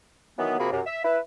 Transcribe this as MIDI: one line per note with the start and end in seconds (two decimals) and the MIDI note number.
0.38 0.58 51
0.38 0.58 52
0.38 0.58 54
0.38 0.58 59
0.58 0.71 48
0.58 0.71 53
0.58 0.71 58
0.58 0.71 66
0.58 0.71 68
0.58 0.71 83
0.71 0.80 42
0.71 0.80 48
0.86 1.04 76
1.05 1.19 64
1.05 1.19 71